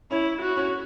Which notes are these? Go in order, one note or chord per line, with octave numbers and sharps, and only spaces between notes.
C#4 E4 C#5
F#4
C#4 C#5